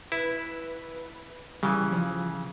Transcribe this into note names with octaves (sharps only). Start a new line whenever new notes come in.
E4 B4
C#3 E3 G3
F3